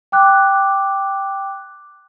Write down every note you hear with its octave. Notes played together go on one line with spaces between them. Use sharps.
G5 D6 F#6